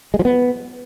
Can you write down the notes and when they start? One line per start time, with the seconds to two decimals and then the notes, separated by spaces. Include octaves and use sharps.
0.14 G#3
0.19 F3
0.25 B3